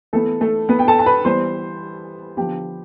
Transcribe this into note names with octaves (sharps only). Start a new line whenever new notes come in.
E3 A3 B3 A4
A3 A4
B3 B4
G5
A4 A5
A5
B4 B5
E3 G3 B3 C5 C6
D3 F3 B3 G4 G5